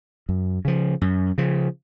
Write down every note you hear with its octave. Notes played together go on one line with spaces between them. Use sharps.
F#2
C#3 F3
F#2
C#3 F3